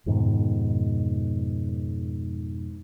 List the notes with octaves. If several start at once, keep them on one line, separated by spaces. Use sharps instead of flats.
F2 G#2 B2 D#3